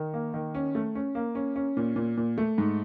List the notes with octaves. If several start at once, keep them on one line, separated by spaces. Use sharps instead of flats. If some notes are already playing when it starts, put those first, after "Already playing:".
Already playing: D#3
A#3
D#3
C#4
A3
C#4
A#3
C#4
C#4
A#2
A#2
A#2
A3
G#2